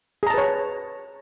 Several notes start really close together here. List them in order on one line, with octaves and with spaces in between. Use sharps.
G#4 A#5 A5 B4 C#5